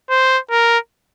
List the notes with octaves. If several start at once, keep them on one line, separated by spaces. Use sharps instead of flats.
C5
A#4